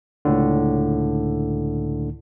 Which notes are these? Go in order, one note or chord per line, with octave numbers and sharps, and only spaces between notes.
C#2 A2 D3